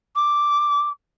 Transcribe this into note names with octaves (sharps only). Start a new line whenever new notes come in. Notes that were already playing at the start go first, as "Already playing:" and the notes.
D6